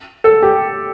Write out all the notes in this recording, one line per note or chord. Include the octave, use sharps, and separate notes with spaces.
A4
G4